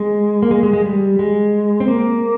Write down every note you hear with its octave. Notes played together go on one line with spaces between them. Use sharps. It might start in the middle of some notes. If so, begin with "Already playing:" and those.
Already playing: G#3
A#3
G#3
G#3
G#3
G3
G#3
C4
A#3